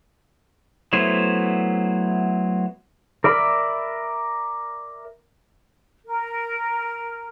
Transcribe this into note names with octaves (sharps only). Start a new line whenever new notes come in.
F#3 A3 B3 E4 C5
A#4 D5 E5 B5
A#4